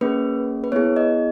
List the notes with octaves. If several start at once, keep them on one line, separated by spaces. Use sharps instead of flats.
A#3 C#4 G#4 B4
B4
B3 E4 G#4 C#5
D#5